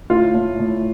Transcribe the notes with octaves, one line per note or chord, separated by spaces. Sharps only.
A2 F4
A2
A2